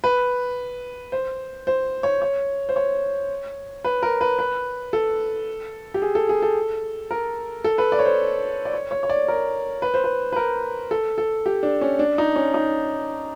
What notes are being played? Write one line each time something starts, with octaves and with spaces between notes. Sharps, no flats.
B4
C5
C5
C#5
C#5
C5
C#5
B4
A#4
B4
B4
A4
G4
G#4
A4
G#4
A4
A#4
A4
B4
D5
C#5
C5
D5
C#5
C#5
C#5
D5
A#4
B4
C5
B4
B4
A#4
A4
A4
G4
D4
C#4
D4
D#4
C#4
D#4